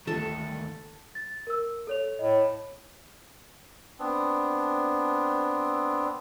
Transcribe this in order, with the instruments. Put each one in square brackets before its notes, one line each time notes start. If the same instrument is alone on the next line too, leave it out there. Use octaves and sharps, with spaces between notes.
[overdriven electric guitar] D2 D#3 [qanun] A4
[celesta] A6
A#4 E6
A4 C#5 F7
[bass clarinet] A2 [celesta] D#5
[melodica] B3 C4 D4